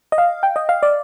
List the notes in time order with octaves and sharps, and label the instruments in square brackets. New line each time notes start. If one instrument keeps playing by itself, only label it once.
[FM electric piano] D#5
F5
G5
D#5
F5
D5